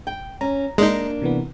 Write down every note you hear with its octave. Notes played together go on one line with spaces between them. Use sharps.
G5
C#4 A#5
G#3 A#3 D4 D#4
C3 E3 B3